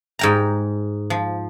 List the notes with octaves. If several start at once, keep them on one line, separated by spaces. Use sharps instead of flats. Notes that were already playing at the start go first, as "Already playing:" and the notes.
G#2 G5 A#5
F3